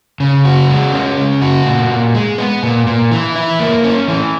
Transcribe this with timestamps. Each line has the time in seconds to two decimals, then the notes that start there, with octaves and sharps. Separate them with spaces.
0.20 C#3
0.45 F#4
0.69 G#3
0.93 C#4
1.17 C#3
1.42 F#4
1.66 A#2
1.90 A#2
2.14 G#3
2.38 B3
2.63 A#2
2.87 A#2
3.11 E3
3.36 E4
3.60 A#3
3.84 C#4
4.08 E3